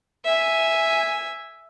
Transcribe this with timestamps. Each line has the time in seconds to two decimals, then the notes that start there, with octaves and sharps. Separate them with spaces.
0.24 E5 G#5